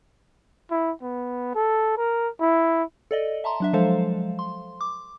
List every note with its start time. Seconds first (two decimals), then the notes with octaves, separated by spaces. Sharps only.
0.71 E4
1.02 B3
1.55 A4
1.98 A#4
2.40 E4
3.11 A4 D5 D#5
3.44 E5 A5 A#5 C6
3.60 F#3 D4 E5
3.73 F3 F#3 G#3 A4 C5 F5
4.39 C6
4.81 D6